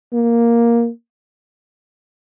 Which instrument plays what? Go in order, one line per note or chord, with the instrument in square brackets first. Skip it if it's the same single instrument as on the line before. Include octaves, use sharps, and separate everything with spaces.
[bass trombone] A#3